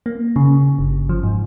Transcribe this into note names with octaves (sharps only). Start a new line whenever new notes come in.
A#3
C#3
G1
F3
G#2